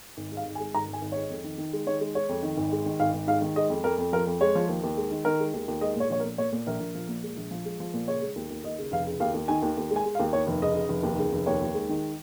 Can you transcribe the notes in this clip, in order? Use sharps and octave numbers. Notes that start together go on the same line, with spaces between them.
G#1
G#2
F5
G#1
G#5
G#3
G#1 A#5
G#1
G#5
G#1
G#2 C#5
F2
D#3
D#3
G#3
D#3 C#5
G#3
G#3 C#5
F2
D#3
G#1
G#3
D#3
G#1 F5
G#1
G#2 F5
D#3
G#3 D#5
F2
F2 A#4
F2
F3 A#4
F2
G#3 C#5
F3
D#2
D#2
G#3
D#3
D#3 A#4
G#3
D#2
D#2
G#3 D#5
A#2 C#5
A#1 C#5
A#4
A#2
A#2 C#5
A#2
A#1 A#4
A#1
F3
A#2
G#3
A#1
F3
G#3
F3
A#2
C#3 C#5
G#3
D#2
D#2
D#2 D#5
C#3
F1 F5
C#3
D#2 F5
D#2
D#3 G#5
D#2
D#2
G#3
G#5
G#3
F5
D#2
D#2 C#5
F1
C#3 D#5
C#3
F1
D#2
C#3
F1
D#2 C#5
D#2
G#3
D#3